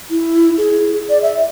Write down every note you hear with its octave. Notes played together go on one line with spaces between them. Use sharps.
E4
G#4
D5
E5